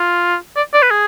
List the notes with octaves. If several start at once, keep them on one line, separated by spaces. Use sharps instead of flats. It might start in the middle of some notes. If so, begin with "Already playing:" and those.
Already playing: F4
D5
D5
B4
G#4